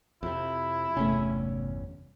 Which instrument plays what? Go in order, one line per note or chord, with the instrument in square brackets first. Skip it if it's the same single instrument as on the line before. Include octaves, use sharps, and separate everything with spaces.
[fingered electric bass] F2 C3 [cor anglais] E4
[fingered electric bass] G1 E2 C#4 [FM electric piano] C3 A3